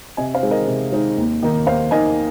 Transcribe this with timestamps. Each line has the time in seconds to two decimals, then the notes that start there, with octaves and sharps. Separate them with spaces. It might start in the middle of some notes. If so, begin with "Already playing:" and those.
0.17 C3 D#5 G#5
0.34 C5 F5
0.43 G#3 C4 D#4
0.51 A#4 D#5
0.67 C3
0.92 G#3 C4 D#4
1.17 D#2
1.43 D#3 A#3 D#4
1.66 D#2 C5 F5
1.91 D#3 A#3 D#4 D#5 G#5